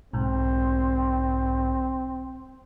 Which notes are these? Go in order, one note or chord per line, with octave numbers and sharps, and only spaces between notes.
B1 G#2 C4